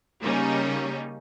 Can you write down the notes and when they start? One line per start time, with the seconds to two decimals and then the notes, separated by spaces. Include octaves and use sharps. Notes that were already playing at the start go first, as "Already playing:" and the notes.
0.20 C#3 G3 A#3 C#4 D#4